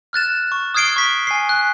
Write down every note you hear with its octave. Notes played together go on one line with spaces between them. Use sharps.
F6 F#6 A6 E7
C#6
D#6 F6 G#6 C7 D7 G7
C#6 B6
G#5 B6 C7
F#6